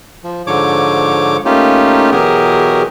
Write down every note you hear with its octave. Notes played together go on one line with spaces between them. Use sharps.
F3
G#2 D3 F3 C#5 D6
A3 A#3 C#4 D#4 F4 G4
E2 B2 F#3 G4 G#4 A#4